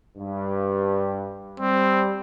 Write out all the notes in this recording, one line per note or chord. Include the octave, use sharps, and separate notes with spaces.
G2
G3 C4